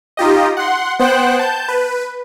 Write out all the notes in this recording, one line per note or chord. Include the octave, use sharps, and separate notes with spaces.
D#4 F4 G4 D#5
F#5 C6
B3 C5 F#5 G5 F#6
A5 G6
B4